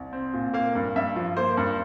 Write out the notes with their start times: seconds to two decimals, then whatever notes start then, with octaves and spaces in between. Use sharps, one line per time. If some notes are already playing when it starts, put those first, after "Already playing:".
Already playing: C2
0.13 C4
0.33 A#2
0.54 A#3 F5
0.75 G2
0.96 G2 E5
1.16 F3
1.37 A#3 C5
1.57 G2